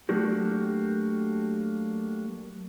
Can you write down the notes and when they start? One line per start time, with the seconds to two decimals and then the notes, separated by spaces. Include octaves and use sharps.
0.09 F#3 A3 A#3 D4 F#4 G4